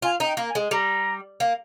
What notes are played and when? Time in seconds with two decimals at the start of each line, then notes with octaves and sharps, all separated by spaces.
0.02 F4 G#5
0.20 D#4
0.25 G5
0.37 A#3
0.49 G#5
0.55 G#3
0.71 G3 A#5
1.40 A#3